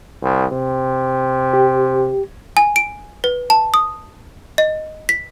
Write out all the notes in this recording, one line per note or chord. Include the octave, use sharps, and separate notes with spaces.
C2
C3
G4
G#5
D7
B4
A5
D#6
D#5
B6